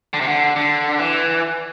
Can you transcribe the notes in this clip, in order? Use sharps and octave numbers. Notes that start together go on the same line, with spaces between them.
D3
C3
D3
D3
E3